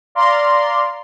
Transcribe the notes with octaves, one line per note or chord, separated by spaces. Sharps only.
D5 F5 A#5 C6